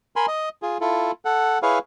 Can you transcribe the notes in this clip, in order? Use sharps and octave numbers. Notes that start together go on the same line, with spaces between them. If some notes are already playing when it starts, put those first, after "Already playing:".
A#4 G#5 B5 C6
D#5
F4 G#4
E4 F4 A4
A4 F#5
E4 G#4 B4 C#5 F5